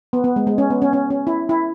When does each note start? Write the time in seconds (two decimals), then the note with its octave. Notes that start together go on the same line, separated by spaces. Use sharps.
0.13 B3
0.24 B3
0.36 G#3
0.47 G#3
0.58 C#4
0.70 B3
0.82 C#4
0.93 C#4
1.10 C#4
1.27 E4
1.49 E4